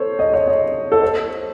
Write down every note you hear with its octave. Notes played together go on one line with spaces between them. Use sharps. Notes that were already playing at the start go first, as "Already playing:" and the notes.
Already playing: A4 C5 C#5
D#5
C#5
D#5
A4
C5